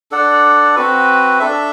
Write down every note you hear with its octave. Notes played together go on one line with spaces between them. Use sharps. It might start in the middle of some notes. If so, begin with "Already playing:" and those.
D4 A4 D5 F#5
C4 F#4 B4
D4 A4 E5